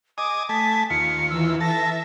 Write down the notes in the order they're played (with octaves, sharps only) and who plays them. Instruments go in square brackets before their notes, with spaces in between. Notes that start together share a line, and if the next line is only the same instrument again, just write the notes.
[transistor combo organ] D#5 G#5 D#6 [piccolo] D6
[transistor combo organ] A3 G#5 A5 [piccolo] B6
[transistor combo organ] D#2 F4 [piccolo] C#7
[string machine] E3 [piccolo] E6
[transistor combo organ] A4 A5 [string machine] E5 [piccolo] A#6